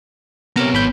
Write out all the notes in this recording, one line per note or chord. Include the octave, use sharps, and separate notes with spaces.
C3 B3 A#4 C#5 A#5
G#1 B5 G6